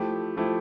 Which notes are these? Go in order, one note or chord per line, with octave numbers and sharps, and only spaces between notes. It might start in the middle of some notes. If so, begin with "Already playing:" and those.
Already playing: F3 A3 E4 G4
F3 A3 E4 G4